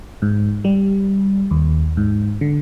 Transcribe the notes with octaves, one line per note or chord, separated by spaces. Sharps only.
G#2
G3
D#2
G#2
D3